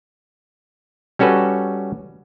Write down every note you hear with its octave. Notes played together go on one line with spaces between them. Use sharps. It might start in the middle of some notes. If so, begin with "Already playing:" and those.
G3 C#4 F#4 A4 B4